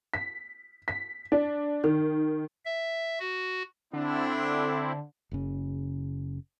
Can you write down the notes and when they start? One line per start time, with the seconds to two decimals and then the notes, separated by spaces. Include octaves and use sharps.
0.14 B6
0.88 B6
1.32 D4
1.84 D#3
2.65 E5
3.20 F#4
3.93 D3 C4 D4 E4
5.31 F#1 C#3